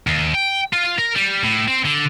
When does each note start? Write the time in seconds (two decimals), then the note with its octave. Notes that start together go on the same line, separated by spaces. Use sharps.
0.07 D#2
0.34 G5
0.73 F4
0.98 A#4
1.15 G3
1.43 A2
1.68 C4
1.84 D3